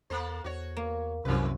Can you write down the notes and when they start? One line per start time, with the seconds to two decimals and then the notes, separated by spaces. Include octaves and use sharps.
0.10 E2 A#3 A4 C5
0.44 E2 F#4 C#5
0.77 A#3
1.25 C2 F#2 C3 E3 B4